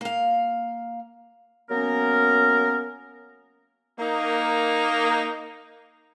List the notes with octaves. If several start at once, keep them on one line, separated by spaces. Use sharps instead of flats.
A#3 F5
F#3 A#3 B3 C#4 A#4
A#3 D#4